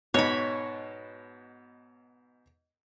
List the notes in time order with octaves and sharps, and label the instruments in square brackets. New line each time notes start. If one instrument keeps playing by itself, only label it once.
[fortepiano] G#2 B2 [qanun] C#5 B5